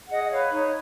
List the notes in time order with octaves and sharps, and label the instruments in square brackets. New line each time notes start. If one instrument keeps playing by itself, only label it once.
[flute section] G#4 D#5 F#5
D#5
B4 C#5 F5
D#4 C#5